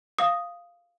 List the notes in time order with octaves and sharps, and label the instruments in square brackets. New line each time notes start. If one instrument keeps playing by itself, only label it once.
[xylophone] F5 D#6